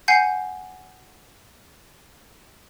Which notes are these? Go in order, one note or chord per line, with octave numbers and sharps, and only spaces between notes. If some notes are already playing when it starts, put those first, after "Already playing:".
F#5 G#5 G6 C7